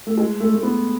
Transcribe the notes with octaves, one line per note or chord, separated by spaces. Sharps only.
A3
G#3
A3
A3
B3